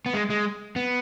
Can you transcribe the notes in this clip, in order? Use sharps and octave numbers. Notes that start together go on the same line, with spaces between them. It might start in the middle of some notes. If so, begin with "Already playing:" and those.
B3
G#3
G#3
B3